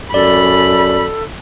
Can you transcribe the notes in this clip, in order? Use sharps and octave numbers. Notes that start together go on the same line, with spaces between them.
F#2 A4 D5 B5